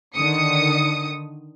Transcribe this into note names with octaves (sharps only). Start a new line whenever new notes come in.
D3 D#3 D#6 C#7